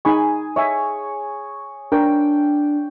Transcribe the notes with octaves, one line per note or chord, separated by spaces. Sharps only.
D#4 G#4 G#5 B5 C#6
C#5 D#5 E5 G#5
D4 A#4 C5 G5 C#6